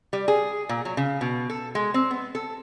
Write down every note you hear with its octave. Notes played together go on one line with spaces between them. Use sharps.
G3
G#4
A#2
F#3
C#3
B2
A4
G#3
C4
B3
A4